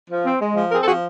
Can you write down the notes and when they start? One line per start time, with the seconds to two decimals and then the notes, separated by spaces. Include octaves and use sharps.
0.10 F3
0.25 C4
0.41 G#3
0.56 F3
0.71 C4 G#4 A#4
0.81 A4
0.87 F3 F#4 G#4